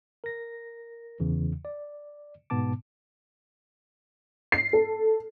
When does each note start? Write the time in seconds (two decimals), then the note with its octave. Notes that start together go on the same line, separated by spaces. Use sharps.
0.24 A#4 A#6
1.20 E2 C#3 E3
1.65 D5
2.50 G#2 B2 B3 A5 D6
4.52 C7
4.73 A4